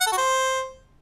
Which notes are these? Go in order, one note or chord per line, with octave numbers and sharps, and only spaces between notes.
F#5
A4
F#4
C5